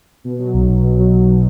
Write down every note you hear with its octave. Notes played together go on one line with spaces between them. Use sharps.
B2
F#3
B1
B1
B2
F#3
B1